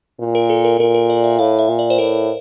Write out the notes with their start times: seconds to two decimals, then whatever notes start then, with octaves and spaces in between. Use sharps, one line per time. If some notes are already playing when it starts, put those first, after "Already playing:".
0.19 A#2
0.35 A#4
0.50 A4
0.65 A#4
0.80 A#2 A#4
0.94 A#4
1.10 D5
1.24 E5
1.39 A2 F5
1.59 E5
1.69 A#2
1.79 D5
1.90 C5
1.98 A2 A#4